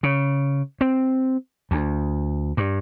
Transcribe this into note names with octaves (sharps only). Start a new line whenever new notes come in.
C#3
C4
D2
G2